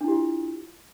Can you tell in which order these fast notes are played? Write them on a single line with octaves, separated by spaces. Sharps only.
D4 E4 G4 F4